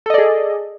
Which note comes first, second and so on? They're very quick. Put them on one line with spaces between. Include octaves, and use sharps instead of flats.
A4 D#5 D5 G#4